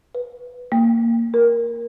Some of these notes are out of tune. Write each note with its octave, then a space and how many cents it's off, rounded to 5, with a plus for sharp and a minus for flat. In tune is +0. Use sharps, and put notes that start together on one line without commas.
B4 +0
A#3 -15
A#4 +10